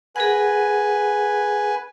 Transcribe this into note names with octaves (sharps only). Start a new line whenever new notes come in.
G#4 A#4 B4 F#5 G#5